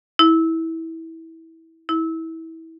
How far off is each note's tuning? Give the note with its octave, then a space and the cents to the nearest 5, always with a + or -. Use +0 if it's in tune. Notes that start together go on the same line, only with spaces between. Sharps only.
E4 -20
E4 -25